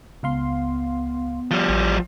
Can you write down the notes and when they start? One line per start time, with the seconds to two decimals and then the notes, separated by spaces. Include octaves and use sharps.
0.23 C#2 B3 F5 C6
1.51 F3 G3 F#6
1.69 A1